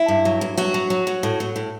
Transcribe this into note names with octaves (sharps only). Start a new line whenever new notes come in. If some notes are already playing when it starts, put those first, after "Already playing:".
Already playing: E4
G2
F#3
G2
F#3 F#4
F#3
F#3
F#3
A2
F#3
A2